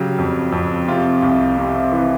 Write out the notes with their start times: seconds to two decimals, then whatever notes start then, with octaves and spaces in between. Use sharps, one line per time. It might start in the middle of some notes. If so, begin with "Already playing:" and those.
Already playing: C#3 F#3 G4
0.18 F2
0.52 F2
0.88 C3 F4
1.23 C2
1.58 C3
1.92 E3